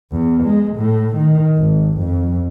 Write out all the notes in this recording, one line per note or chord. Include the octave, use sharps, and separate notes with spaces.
E2
G#3
A2
D#3
G#1
F2